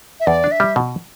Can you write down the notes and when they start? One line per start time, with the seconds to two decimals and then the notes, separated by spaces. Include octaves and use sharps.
0.20 E5
0.27 E2 D5
0.44 D4
0.52 E5
0.60 G3
0.76 B2